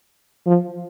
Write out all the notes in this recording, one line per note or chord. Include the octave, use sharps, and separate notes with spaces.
F3